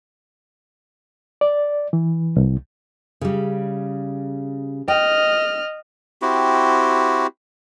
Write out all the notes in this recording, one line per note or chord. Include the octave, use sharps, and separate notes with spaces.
D5
E3
C2
C#3 G3
D#5 G5 F6
C4 E4 F#4 G4